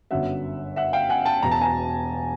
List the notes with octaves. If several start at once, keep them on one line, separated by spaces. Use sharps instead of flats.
G1 F#2 D3 F#3 E5 F#5
E5 F#5
F5 G5
F#5 G#5
G5 A5
E1 E2 B2 A#5
A5
G#5 A#5